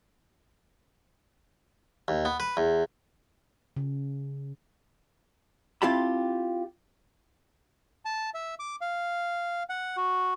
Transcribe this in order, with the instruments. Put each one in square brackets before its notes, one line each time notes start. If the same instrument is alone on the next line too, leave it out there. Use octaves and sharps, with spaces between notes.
[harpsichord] D#2
B3
B4
E2
[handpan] C#3
[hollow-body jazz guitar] C4 E4 F4 G4 A5 B5
[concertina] A5
E5
D6
F5
F#5
F#4